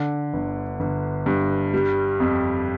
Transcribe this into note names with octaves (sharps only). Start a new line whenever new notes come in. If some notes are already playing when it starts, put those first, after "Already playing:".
Already playing: D3
G1
G1
G2
G3
F2